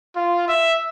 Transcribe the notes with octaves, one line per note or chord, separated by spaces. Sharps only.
F4
E5